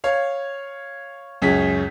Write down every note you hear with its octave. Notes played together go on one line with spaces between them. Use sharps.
C#5 F5
C#2 F#2 C#4 G#4 B6